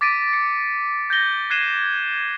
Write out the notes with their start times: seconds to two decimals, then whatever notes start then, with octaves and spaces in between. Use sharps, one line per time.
0.01 D6 A6 B6 D7 D#7
0.33 C#7
1.10 G6 A6 A#6 G7
1.50 F#6 G#6 C7 D#7 E7 G7